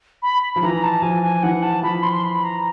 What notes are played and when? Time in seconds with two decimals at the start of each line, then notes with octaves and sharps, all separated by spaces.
0.22 B5
0.42 B5
0.56 F3
0.63 E3 A#5
0.83 A5
1.02 F3 G#5
1.23 G#5
1.43 E3 F#5
1.63 A5
1.83 F3 B5
2.03 C6
2.13 C6
2.24 B5
2.43 A#5